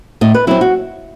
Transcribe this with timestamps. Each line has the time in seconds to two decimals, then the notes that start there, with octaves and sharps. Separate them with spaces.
0.21 A2 D#5
0.34 B4
0.47 F#3 C4 E4
0.61 F#4